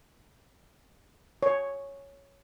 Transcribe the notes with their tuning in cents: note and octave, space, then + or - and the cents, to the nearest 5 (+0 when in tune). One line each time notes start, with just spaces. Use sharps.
C#5 +0